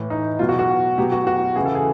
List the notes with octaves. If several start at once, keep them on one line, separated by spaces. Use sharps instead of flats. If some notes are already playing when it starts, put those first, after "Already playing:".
Already playing: A2 E3
D#4
B2 F#3 F4
F#4
F#4
B2 F#3 G4
F#4
F#4
C#3 E3 G#4
A4
G#4